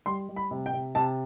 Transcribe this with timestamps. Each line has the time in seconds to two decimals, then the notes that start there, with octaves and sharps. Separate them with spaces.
0.06 G3 C6
0.29 G3
0.36 B5
0.51 C3
0.66 G5
0.73 C3
0.95 C3 A5